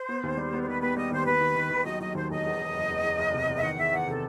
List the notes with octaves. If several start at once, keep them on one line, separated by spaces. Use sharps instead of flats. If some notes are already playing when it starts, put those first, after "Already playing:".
Already playing: C5
B3
D#2
G3
B3
C5
D#3 B4
B3 B4
G3 D#5
D#2 C5
D#2 B4
D#3
D#3
D#3
F#3 D#5
F#3 D#5
D#2 C5
E1 D#5
E2
E2
F#1
E2
E2
F#1
C3
E2
E5
D#3 F#5
E2 E5
E2 F#5
C3 A4